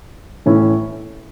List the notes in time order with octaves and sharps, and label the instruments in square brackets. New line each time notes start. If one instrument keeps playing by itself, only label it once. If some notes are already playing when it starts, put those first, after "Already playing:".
[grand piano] A2 E3 A3 C#4 E4